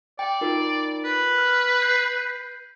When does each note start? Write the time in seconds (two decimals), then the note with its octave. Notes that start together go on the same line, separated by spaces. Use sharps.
0.19 D5 G5
0.41 D#4 F4 A#4
1.05 B4
1.38 F6
1.82 G6 C7